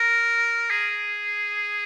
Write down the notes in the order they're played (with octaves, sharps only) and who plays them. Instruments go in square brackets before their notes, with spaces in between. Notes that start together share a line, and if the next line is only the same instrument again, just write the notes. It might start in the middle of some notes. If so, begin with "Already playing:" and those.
Already playing: [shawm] A#4
G#4